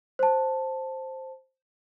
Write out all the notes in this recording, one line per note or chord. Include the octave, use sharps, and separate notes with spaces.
C5 A5